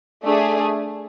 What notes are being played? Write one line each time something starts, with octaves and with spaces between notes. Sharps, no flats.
A3 D4 G#4